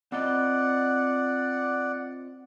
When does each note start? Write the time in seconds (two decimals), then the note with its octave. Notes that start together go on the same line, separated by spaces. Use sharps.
0.12 C4 F4 D5 D#5 F#5